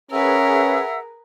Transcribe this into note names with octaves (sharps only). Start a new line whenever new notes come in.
C#4 G#4 A#4 B4 E5 F#5 E6